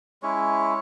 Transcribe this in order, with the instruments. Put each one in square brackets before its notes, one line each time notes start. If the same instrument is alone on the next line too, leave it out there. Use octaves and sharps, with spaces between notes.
[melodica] G#3 C#4 E4 C#5